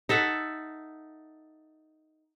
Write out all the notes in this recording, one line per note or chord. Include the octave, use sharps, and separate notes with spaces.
D#4 A4 E5 F#5